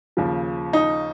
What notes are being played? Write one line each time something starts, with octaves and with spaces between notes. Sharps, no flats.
D#2 C#3 F3
D#4